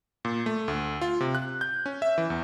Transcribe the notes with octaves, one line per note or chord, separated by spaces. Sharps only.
A#2
A3
D2
F4
C3
F#6
G6
C#4
E5
E3
E2